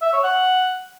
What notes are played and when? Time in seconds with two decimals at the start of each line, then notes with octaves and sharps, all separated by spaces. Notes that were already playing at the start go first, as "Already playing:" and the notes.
0.02 E5
0.13 C#5
0.24 F#5